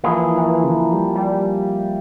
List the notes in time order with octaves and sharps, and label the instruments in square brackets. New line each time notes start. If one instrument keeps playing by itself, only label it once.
[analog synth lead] E3 [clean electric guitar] F3 A#3 E4 G#4
[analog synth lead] E3
C#3
E3
G3
G3